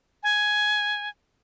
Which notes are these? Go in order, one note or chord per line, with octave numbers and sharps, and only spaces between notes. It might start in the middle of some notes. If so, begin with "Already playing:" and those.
G#5